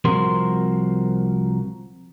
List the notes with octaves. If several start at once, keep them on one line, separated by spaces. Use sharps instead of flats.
C2 F3 C4 F#4 A#4 C6